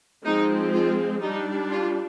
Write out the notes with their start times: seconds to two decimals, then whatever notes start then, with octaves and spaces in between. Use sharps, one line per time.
0.25 F3 G#3 C4 D#4
0.73 F4
1.21 G3 D4 D#4
1.69 F4